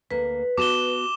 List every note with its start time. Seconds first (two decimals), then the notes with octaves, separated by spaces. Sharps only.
0.11 D2 A#3 B4
0.58 B3 F#4 A5 D6 E7 G7